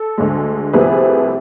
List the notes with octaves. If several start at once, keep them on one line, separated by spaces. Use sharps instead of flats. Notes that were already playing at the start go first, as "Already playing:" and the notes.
Already playing: A4
D2 D3 G#3
C2 C3 F3 A3 G#4 B4